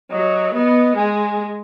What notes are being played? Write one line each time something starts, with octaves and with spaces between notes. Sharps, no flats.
F#3 D#5
B3 D#5
G#3 G#5